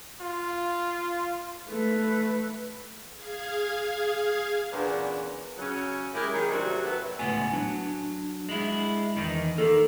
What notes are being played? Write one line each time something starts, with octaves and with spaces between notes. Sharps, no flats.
F4
A3 B4
G#4 F5 G#5
E2 A#2 B3 C#4 D4
C#3 F#3 C#4
G#3 E4 G4 G#4 A#4
D#3 A#3 G#4
A2 C3 F#3 G3 D4 F#4
B3 A4 E5
C#2 A2 B3 G#5
F#3 D4
G#3 E4
E2 D#3 D#4
D#3 A#3 A4